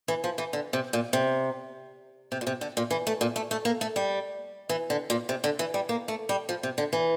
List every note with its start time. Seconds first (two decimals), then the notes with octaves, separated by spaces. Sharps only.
0.08 E3
0.24 F3
0.38 E3
0.53 D3
0.73 C3
0.93 A#2
1.13 C3
2.32 C3
2.41 A#2
2.47 C3
2.61 D3
2.77 A#2
2.91 E3
3.07 A3
3.21 A#2
3.36 A3
3.51 A3
3.65 A#3
3.81 A3
3.96 G3
4.69 E3
4.90 D3
5.10 A#2
5.29 C3
5.44 D3
5.59 E3
5.74 G3
5.89 A#3
6.08 A3
6.29 G3
6.49 F3
6.63 C3
6.78 D3
6.93 E3